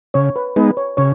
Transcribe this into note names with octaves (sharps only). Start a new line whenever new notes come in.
C#3 C#5
B4
G#3 B3 D#4 B4
C#5
C#3 C#5